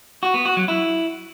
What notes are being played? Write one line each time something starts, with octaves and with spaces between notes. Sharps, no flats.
F#4
B3
F#4
F#3
E4